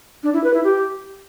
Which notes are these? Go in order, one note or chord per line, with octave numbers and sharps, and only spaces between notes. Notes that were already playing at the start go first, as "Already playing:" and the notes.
D4
E4
B4
E4
G4